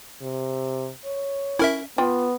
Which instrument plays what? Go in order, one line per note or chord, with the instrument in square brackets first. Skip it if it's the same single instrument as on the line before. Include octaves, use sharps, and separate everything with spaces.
[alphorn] C3
C#5
[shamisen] C#4 [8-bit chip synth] E4 A#4 E5
[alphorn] B3 [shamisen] F4 G5